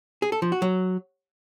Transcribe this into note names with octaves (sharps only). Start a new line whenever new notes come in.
G#4
A4
F3
F#4
F#3